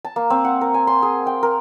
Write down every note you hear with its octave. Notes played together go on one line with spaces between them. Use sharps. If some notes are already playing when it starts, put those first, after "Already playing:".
A5
A#3
C4
F#5
A#4
G#5
C6
G#4
G5
A#4